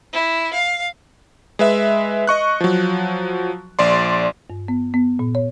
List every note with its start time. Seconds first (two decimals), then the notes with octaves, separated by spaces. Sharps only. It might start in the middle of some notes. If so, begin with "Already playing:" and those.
0.13 E4
0.54 F5
1.59 G#3 B4 E5
2.27 D#5 C#6 F#6
2.60 F3 F#3
3.79 A#1 D5 C6
4.50 G2
4.68 B3
4.94 B3
5.19 A#2
5.35 C#5